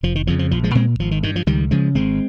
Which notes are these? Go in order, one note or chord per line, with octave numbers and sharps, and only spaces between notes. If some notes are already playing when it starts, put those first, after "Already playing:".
F1 F3
D#3
F2 C#3 F3
F3
A#1 F3
F3 G#3
A#2 G#3 C4
G#1 F3
D#3
G2 D#3
F3
C#2 D#3 G3
C#3 F3 G#3
G#1 G#3 C4